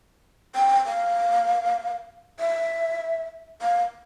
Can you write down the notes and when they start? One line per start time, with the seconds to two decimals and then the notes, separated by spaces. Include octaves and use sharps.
0.55 G5
0.86 F5
2.39 E5
3.62 F5